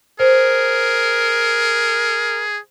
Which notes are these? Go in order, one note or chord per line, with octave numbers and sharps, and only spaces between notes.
G#4 A#4 C5